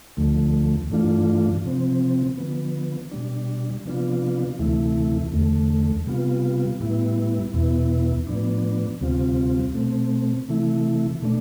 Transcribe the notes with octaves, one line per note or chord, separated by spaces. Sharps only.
D2 D3 F3 A3
G2 E3 A3 D4 F4
C3 F3 C4
D3 F3 B3
B2 G3 D4
C3 F3 B3 D4 F4
D2 C3 E3 A3 E4
E2 D3 A3
C3 G3 B3 F4
A2 G3 B3 E4
E2 B2 B3 E4
A2 F3 B3 D4
D2 C3 G3 C4 F4
B2 A3 C4
C3 E3 A3 E4
B2 A3 D4